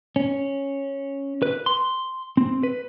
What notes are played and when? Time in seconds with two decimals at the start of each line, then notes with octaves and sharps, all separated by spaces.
0.16 C#4
1.42 B4
1.66 C6
2.37 C4
2.63 B4